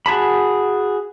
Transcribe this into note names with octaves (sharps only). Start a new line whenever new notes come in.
F#4 G#4 A5 B5